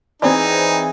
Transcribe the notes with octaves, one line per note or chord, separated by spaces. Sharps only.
E3 C4 D#4 G#4 D5